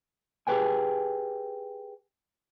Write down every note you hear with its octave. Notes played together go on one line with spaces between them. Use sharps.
G4 G#4 B4 G5 G#5